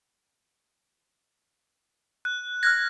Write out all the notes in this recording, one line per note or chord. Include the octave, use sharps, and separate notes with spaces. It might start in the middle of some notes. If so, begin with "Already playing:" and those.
F#6
F6 F#6 G#6 A#6